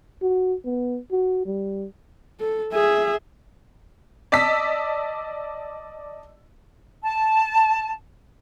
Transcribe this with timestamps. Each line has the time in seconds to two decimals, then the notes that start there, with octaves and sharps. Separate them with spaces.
0.22 F#4
0.65 B3
1.11 F#4
1.46 G3
2.40 A4
2.73 G#4 E5
4.32 D5 D#5 A5 E6 B6
7.03 A5